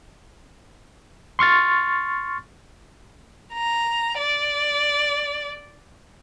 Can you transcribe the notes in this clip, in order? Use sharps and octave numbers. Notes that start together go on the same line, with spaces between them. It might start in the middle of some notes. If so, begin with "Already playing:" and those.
C6 C#6 F6 A6
A#5
D5